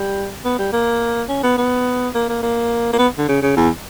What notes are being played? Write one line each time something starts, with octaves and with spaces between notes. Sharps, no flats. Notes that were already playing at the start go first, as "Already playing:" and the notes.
Already playing: G3
B3
G3
A#3
C#4
B3
B3
A#3
A#3
A#3
A#3
B3
D3
C#3
C#3
E2